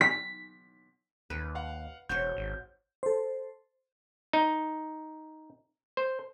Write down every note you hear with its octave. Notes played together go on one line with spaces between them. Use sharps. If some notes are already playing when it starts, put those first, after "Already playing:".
B6
D#2 B4
F5 F#5
E1 F#4 C5 C#5 G6
G#1
A4 C5
D#4
C5